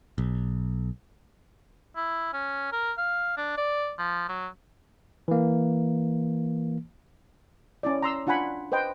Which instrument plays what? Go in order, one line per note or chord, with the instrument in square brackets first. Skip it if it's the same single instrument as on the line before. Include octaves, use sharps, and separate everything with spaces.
[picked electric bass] B1
[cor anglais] E4
C#4
A#4
F5
D4
D5
F3
F#3
[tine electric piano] E3 A#3
[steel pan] C#4 E4 D5
A#5 C6 E6
D4 F4 F#5 G#5 B5
B4 C5 D#5 G5